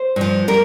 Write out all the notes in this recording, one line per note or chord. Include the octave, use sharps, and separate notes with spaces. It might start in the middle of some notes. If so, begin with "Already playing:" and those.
Already playing: C5
G2 F3
G3 A#4